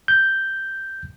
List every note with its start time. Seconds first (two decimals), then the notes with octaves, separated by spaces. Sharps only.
0.08 G6